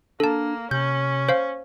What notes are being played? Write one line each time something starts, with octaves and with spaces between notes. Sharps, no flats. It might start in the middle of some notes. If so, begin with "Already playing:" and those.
A#3 D4 A4 A5
C3 C#4 G6
C5 F5